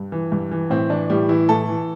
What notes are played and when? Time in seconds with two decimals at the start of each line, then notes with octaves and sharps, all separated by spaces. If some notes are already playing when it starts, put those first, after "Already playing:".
Already playing: G2
0.12 E3
0.32 G2
0.51 E3
0.70 A2 C4
0.90 E3 D4
1.10 A2 G3
1.29 E3 E4
1.49 A2 A4
1.69 E3